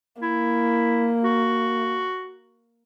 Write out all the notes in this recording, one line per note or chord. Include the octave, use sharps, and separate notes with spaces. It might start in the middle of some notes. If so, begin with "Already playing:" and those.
A#3 E4
F#4